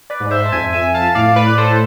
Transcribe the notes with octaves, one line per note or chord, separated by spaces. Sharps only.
B4 D5
G#2
C5 E5
A5
F2 E5 G#5
E5 G#5
F5 A5
A2 D5 F5
B4 D5
A4 C5